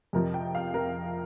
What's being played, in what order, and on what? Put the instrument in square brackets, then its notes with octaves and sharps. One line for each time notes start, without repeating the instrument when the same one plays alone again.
[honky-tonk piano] F2 C3 F3 A#4
G5
F5
A#4